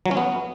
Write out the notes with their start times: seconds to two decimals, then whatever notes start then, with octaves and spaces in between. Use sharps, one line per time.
0.06 F#3
0.11 C#4
0.17 B3